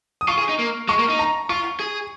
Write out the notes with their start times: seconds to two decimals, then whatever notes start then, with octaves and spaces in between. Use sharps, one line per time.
0.21 D#6
0.28 F4 C#6
0.38 G#4
0.49 D#4
0.59 A#3
0.88 G#3 C#6
0.99 A#3
1.09 D#4
1.19 A#5
1.49 F4 C#6
1.80 G#4